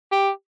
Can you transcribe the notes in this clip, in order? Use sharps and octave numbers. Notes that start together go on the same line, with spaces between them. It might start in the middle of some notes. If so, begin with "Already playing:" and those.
G4